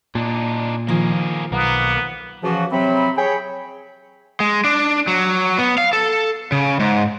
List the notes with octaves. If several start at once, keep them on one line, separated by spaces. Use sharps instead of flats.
A#2 D4 D#4
D#3 F3 A#3 G#4
B1 A#3 B3
C#3 E3 F3 F#4
C3 F#3 C4 B5
G#4 C#5 G5 B5
G#3
D4
F#3
B3
F5
A4
C#3
G#2